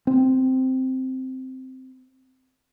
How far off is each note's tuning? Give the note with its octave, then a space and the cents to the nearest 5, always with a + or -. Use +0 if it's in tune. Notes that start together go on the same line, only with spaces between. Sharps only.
C4 -5